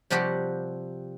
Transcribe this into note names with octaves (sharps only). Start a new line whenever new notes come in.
C3 F3 G3 F#4 G4 F#5